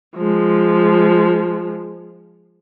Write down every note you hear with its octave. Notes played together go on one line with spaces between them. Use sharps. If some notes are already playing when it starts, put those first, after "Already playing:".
F3 G#3